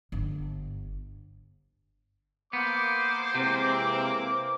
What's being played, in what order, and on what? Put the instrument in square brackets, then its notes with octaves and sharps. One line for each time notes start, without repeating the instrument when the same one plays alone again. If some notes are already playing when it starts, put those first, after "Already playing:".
[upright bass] G1
[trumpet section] A#3 D6 [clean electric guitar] B3 [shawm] C5
[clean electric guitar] C3 [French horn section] E3 G#3 C4